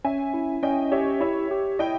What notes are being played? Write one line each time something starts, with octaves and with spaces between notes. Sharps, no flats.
C#4 E5 G#5
E4
C#4 D#5 G5
G4 C#5 E5
E4 C#5 E5
G4
E4 D#5 G5